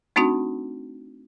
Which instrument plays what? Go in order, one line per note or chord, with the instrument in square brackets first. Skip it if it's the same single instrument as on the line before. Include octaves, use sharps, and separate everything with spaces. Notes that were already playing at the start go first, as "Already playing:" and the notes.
[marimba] A3 C4 D4 D#4 F#4